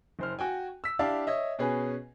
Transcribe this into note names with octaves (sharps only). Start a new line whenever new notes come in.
F#1 C5 F6
F#4 G5 G#5
E6 B6
D4 E4 G4 D5 F5 A5
C#5 D#5 E5
B2 C#4 G#4 B4